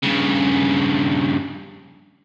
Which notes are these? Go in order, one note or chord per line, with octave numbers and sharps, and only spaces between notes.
G2 C#3